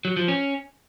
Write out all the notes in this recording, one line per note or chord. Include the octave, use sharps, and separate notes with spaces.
F#3
F3
C#4